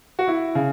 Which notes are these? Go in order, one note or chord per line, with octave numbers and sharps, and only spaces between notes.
F#4
E4
C#3